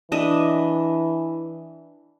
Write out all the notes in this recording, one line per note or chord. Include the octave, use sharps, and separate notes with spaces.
E3 D4 D#5 E5